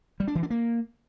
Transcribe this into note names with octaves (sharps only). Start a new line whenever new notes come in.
G3
D4
E3
D4
A#3